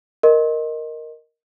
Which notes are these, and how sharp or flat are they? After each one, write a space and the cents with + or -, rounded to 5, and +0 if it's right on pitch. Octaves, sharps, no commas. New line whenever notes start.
A#4 +0 D#5 +0 C6 +30